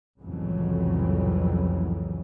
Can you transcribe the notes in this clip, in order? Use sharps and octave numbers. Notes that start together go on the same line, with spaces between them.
C2 F2 A2 C#3 E3 F#3